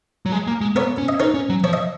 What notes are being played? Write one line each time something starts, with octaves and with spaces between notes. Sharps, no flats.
F#3
G#3
A#3
G#3
B3 A#4 C#5
C#4
D#5
D#4 A#4 C#5
C#4
F#3
F3 C#5
D#5